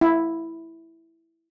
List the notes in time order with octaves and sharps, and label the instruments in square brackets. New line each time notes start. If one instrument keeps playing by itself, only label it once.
[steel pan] E4